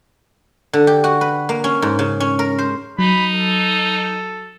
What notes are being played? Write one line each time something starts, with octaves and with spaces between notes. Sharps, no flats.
D3
G4
F#4
B4
A#3
C#4
G#2
C#3
C#4
A#4
C5
F#3 D#4 B5
A4